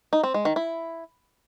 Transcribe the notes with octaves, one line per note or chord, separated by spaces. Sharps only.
D#4
C4
G#3
D#3
E4